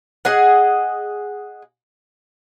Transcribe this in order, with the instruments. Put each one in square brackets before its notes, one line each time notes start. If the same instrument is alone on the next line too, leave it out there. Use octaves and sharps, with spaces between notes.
[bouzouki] G#4 D#5 F#5